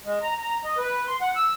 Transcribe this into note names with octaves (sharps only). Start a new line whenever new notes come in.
G#3
A#5
A#5
D#5
B4
C6
F#5
E6